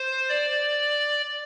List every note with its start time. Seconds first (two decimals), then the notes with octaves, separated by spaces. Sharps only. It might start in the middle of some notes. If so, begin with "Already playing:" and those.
Already playing: C5
0.29 D5